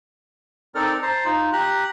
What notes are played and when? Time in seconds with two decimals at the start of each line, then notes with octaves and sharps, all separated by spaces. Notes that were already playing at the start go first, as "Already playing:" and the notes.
0.75 C4 D#4 A4 A#4 D5 F6
1.02 C5 A5 A#5
1.25 D#4 F4
1.53 G4 A#5 F#6